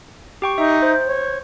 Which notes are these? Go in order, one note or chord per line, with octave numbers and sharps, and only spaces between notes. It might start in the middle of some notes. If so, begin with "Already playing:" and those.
G4 G5 C#6
D#4 E5
C5
C#5